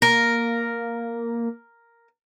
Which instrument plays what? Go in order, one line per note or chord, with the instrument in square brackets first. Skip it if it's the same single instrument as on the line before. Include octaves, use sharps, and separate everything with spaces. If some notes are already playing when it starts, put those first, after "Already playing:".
[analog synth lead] A#3 [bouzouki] A#4